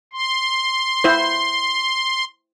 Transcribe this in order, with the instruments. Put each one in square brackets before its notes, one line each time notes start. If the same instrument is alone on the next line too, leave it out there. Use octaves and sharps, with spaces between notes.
[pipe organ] C6
[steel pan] E4 C5